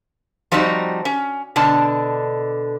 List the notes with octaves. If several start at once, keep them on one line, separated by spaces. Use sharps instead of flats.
F3 G3 C4 D#4 F#4
C#4
B2 D3 D4 A5